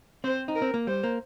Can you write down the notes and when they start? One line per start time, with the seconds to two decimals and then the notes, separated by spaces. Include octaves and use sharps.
0.24 C4 C5
0.48 D#4
0.56 A#4
0.62 C4
0.74 A#3
0.87 G3 C5
1.04 A#3